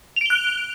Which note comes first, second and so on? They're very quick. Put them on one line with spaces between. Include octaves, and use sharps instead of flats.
F7 D7 G7 F#6